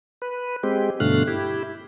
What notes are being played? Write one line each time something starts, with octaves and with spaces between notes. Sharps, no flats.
B4
G#3 C4 G4
G2 B2 D3 A3 F5 F#6
E4 G4